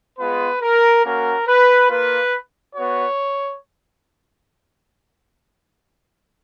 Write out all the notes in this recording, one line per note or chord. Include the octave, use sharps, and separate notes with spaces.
G#3 B3 F4 B4
A#4
A#3 C#4 F#4 A#4
B4
A#3 F4 B4
B3 F#4 C#5